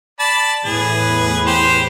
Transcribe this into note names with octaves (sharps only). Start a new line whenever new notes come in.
D5 A5 B5
E2 A2 G#4 B4
G4 C5